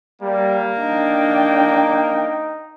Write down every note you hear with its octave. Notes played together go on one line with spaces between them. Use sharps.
G3 A#3 A#4
D4 D#4 G5